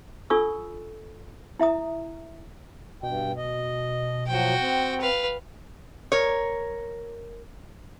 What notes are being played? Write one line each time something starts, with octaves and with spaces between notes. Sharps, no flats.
D4 F4 A4 C#6 D#6 E6
E4 E5 A#5 D#6
G2 B2 G5
D#5
F3 F#3 F#4 G5
C4
B4 F5
A#4 C#5